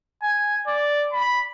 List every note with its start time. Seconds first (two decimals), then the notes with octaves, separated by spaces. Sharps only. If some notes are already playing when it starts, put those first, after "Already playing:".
0.22 G#5
0.67 D5
1.13 B5